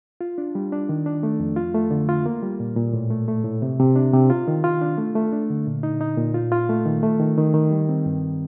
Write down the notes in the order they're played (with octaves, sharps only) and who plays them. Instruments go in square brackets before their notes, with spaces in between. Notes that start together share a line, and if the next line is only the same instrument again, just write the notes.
[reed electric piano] F4
D4
G3
D4
D#3
D4
A3
F2
F4
A3
D3
F4
A#3
G3
A#2
A#2
A2
A3
A3
A2
C3
C3
D4
C3
F4
D#3
F4
D4
A3
A3
D4
D3
A#2
D#4
D#4
A#2
F4
F4
A3
D#3
A3
D#3
D#3
D#3
G3
C4
G2